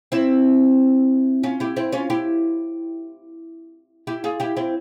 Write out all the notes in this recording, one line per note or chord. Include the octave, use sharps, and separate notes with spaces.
C4 E4
C#4 F4
E4 G4
C4 E4
C#4 F4
E4 G4
E4 G4
F4 G#4
E4 G4
C4 E4